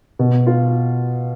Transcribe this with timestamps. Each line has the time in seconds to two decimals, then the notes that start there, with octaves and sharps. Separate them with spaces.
0.19 B2
0.47 F4